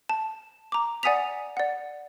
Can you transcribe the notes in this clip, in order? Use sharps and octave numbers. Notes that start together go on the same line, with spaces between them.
A5
A#5 D6
D5 F#5 G#5 D#6 B6 F7
D5 F#5